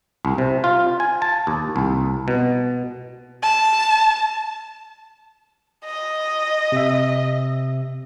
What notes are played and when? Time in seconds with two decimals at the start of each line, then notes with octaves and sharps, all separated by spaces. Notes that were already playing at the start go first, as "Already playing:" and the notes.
0.25 C2
0.38 C3
0.64 F4
1.00 G#5
1.22 A5
1.47 D#2
1.76 C2
2.28 B2
3.43 A5
5.85 D#5
6.72 C3 E5